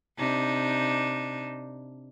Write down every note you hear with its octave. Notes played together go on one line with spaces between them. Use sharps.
C3 D4 D#4